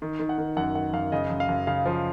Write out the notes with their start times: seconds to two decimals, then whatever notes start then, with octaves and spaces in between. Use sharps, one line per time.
0.02 D#3
0.20 D#3
0.29 F#5
0.38 D#3
0.57 F#2 F#5
0.75 D#3 F#5
0.93 F#2 F5
1.12 C#3 D#5
1.30 F#2
1.40 F5
1.49 F#2
1.67 C#3 F5
1.86 F3